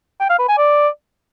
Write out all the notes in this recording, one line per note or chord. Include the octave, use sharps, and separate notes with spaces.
G5
F5
B4
G#5
D5